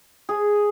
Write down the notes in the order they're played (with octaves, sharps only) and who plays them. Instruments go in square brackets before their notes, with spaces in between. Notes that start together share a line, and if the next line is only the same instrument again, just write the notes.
[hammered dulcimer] G#4